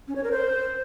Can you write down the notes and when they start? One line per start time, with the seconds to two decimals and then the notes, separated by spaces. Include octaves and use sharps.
0.08 C#4
0.16 C#5
0.24 A#4
0.31 C5